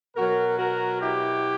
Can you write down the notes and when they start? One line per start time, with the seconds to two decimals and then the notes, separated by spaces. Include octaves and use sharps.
0.16 B2 F#3 F#4 A#4
0.58 F#4 A#4
1.02 E4 G4